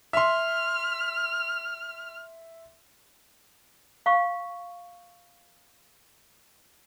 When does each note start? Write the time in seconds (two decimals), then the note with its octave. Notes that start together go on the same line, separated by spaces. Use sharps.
0.13 E5 C6 F6
4.06 F5 C#6